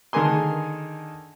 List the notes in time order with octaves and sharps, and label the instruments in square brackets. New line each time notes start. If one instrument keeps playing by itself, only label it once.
[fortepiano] D3 D#3 G#4 A#4 G#5 C6